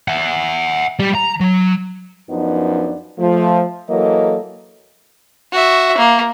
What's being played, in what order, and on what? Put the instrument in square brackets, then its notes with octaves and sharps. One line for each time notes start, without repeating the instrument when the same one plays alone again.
[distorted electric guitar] E5 F#5
G3
A#5
F#3
[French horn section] F#2 F3 B3 D4 D#4
F3 A3
E3 F#3 A#3 A4 D#5
[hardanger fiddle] F#4 E5
A#3